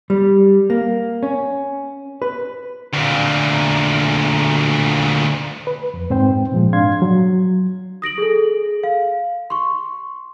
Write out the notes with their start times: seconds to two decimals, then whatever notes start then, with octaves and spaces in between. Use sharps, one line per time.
0.10 G3
0.70 A#3
1.23 C#4
2.22 B4
2.94 D2 A#2
5.67 B4
5.94 F2
6.10 G#2 C4 C5 G5
6.52 A#2 F3 G#3
6.73 G#2 D4 F5 C6 G#6
7.02 F#3
8.02 D#6 A#6 D7 F#7
8.18 G#4 A4
8.84 F5
9.50 C6 C#6